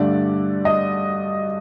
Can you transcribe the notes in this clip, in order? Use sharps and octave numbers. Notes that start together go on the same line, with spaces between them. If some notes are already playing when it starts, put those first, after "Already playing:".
Already playing: G2 D3 A3 D5
D#5